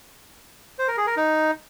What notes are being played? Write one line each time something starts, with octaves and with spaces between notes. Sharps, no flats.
C5
A#4
G#4
A#4
D#4